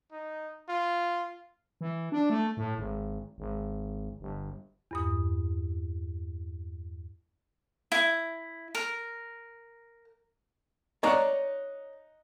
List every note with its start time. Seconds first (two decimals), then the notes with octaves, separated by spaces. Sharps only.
0.12 D#4
0.69 F4
1.81 E3
2.12 D4
2.30 A3
2.57 A2
2.78 G#1
3.38 G#1
4.20 G1
4.91 E2 G2 D#6
7.92 E4
8.75 A#4
11.03 D#4 C#5 D5 F#5 A#5